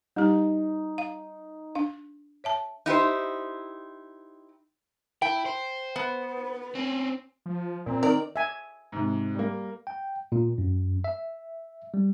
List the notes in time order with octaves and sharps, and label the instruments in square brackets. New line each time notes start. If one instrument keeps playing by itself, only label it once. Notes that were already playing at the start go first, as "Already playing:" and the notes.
[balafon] G3 G4 [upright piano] D#4
[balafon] F5
D4 F5
C#5 E5 A5
[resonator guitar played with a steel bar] D#4 E4 G4 C5
[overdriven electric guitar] E4 [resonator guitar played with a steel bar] G5
[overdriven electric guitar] C5
[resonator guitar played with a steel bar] B3
[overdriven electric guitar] C4 C#4
[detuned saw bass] F3
[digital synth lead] A#2 [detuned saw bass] C4
[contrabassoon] D#3 [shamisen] A#4 [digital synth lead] D5
[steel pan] E5 G#5
[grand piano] G#2 C3
G3 A#3
[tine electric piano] G5
A#2
F#2
E5
G3